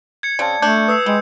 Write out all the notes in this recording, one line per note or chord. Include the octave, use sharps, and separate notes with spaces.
G#6 C#7
C#3 C4 D5 A5
A3 D4 G6
B4 D#6 E6 C7
G3 G#3